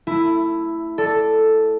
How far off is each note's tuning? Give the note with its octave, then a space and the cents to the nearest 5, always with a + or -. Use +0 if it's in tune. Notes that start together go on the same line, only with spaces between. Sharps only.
A3 +25 E4 +5
A4 +0 D5 +0